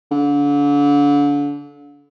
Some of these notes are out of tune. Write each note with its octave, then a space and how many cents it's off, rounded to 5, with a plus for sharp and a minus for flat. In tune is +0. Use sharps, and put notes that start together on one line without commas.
D3 -35